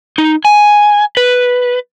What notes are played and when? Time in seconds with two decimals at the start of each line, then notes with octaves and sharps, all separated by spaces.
0.18 D#4
0.45 G#5
1.17 B4